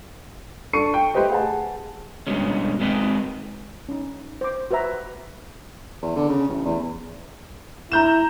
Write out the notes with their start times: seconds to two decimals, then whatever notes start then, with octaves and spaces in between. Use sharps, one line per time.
0.73 D4 A4 C#6 C#7 D#7
0.94 G5
1.14 A3 G4 B4 C5 D#5
1.30 G#4 F#5 A5
2.27 G2 B2 G#3 C#4
2.80 G#3 C4 D#4 B4 D5 D#5
3.89 C#4 D#4
4.41 C5 D6
4.71 F#4 B4 C5 E5 A#5
6.02 E2
6.16 D3
6.29 C#3
6.48 A1
6.66 E2
7.92 E4 A#5 G6 E7